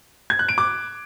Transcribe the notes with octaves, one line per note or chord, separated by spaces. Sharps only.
G#6
F#6
D7
D6